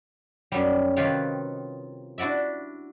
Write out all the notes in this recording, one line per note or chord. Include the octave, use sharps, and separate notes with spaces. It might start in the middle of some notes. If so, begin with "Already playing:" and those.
F#2 F#3 G3
C3 D#3 F4 G4 B4 C#5
D4 E4 F#4 D5 E5